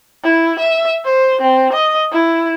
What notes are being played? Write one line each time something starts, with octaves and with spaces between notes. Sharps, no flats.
E4
E5
C5
C4
D#5
E4